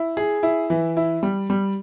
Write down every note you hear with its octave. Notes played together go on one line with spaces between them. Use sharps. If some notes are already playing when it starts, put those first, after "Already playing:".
Already playing: E4
G#4
E4
E3
E4
G3
G3